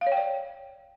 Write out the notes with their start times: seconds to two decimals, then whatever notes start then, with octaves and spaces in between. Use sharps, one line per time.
0.01 F5
0.07 C#5
0.12 G5
0.17 D5